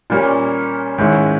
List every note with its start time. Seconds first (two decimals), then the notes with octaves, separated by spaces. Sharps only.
0.10 A#2 G3 A#3 C#4
0.98 G#2 D#3 G#3 C#4 E4